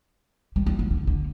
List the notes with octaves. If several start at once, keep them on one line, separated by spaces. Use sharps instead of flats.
G3
G3
F#3
D3
D3